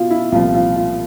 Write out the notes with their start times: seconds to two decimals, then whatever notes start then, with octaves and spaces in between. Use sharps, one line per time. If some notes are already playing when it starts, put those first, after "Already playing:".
Already playing: B2 F4
0.11 E4
0.32 C2 A#2 F3 F4
0.55 F4
0.76 F4